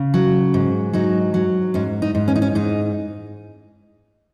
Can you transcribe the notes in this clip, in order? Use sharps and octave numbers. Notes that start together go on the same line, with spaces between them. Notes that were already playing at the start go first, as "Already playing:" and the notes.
Already playing: C#3
F#3
G#2
F#3 D#4
F#3
G#2 C#4
D#4
G#2
C#4
D#4
C#4
G#2 D#4